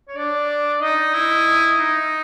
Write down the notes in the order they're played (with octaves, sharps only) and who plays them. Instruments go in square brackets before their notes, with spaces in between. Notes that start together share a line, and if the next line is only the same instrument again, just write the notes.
[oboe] C#5
[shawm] D4 [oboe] D5
[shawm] D#4 [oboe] D#5
[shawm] E4
D#4